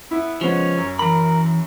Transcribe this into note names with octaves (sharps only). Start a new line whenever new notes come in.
B3 E4
C#3 F3 G#3 B3 C#4
F#2
E3 A#4 B5